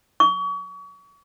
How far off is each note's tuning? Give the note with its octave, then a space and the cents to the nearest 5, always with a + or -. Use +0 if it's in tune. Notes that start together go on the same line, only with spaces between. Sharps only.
C#6 +35